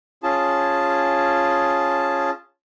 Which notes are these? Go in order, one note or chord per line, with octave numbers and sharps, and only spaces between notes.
C#4 F4 G#4 A5